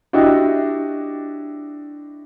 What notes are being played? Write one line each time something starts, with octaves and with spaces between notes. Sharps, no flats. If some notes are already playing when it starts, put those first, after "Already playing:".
D4 E4 F#4 G4 D#5